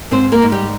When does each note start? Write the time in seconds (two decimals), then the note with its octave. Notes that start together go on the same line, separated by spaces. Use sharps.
0.11 G#2 C4 C5
0.32 A#3 A#4
0.42 G#2
0.52 G3 G4